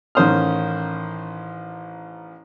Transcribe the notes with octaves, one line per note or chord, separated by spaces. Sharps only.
A1 D#3 C#4 C5 D#6 F6